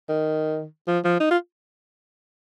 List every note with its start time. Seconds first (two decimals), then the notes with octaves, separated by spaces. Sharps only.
0.09 D#3
0.87 F3
1.04 F3
1.20 D#4
1.31 F4